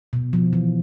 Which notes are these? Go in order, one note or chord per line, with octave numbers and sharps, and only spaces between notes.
B2
F3
E3